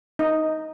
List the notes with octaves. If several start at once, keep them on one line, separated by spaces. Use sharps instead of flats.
D#4